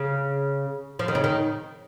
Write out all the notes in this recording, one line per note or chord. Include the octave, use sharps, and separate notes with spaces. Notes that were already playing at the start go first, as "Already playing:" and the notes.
Already playing: C#3
F3
D#3
C#3
D#3